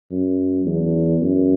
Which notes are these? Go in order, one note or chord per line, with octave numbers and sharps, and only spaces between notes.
F#2
E2
F#2